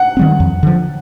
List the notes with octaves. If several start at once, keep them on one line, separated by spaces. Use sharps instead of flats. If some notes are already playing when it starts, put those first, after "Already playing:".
Already playing: F#5
D#3 G3 C4
F2
D3 F3